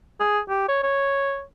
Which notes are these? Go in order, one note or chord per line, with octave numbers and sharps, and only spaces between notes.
G#4
G4
C#5
C#5